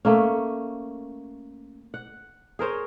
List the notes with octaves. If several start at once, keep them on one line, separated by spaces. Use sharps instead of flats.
A3 A#3 C#4
F#5
G#4 A#4 C5 C#5